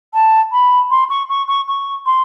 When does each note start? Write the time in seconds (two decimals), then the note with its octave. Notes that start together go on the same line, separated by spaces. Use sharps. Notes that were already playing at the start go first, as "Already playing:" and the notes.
0.13 A5
0.51 B5
0.90 C6
1.09 C#6
1.28 C#6
1.47 C#6
1.68 C#6
2.05 C6